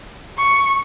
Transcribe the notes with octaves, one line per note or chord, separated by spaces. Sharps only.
C#6